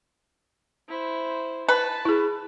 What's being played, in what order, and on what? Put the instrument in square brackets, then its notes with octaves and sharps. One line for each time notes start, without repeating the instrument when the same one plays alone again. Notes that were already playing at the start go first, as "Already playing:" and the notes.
[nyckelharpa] E4 C5
[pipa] B4 [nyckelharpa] A5
[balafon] E4 G#4